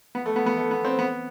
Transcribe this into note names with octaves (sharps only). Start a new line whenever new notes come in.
B3
A3
B3
B3
A3
B3
C4
B3